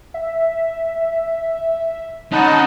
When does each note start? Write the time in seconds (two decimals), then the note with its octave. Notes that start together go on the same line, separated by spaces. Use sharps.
0.14 E5
2.32 C#4 D#4 D#5 F#5 A5 B5